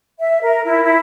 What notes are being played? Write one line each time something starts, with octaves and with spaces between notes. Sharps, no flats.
E5
A#4
E4
E4